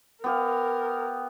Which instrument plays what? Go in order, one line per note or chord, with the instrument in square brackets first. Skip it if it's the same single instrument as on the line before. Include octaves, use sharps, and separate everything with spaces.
[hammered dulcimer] B3 G4 F5 [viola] A#4